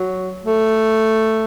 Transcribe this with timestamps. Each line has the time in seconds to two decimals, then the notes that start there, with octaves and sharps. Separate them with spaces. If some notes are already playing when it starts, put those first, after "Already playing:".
Already playing: F#3
0.44 A3